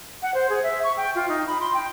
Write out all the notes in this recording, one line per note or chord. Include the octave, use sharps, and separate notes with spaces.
F#5
C5
G#4
E5
C#6
G5
F4
D#4
B5
C6
G5